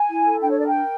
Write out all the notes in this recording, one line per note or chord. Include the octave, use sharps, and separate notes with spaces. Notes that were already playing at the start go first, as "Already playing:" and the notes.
Already playing: G#5
E4
A4
D4 G5
C#5
A#4 D5
G5
A#4